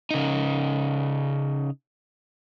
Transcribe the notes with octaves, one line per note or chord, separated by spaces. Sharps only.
C#3 D#4